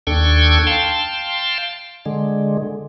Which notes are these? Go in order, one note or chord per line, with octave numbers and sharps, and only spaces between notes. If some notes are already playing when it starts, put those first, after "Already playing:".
D#2 D4 A4 G5 C#6 G#6
F5 G5 A5 C6
D3 G#3